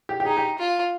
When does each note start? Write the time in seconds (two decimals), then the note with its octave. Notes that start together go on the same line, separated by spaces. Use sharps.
0.09 G4
0.20 G4
0.25 D#4 G#4
0.37 G4
0.58 F4